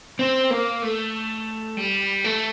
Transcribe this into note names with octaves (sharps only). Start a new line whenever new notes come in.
C4
A#3
A3
G3
A3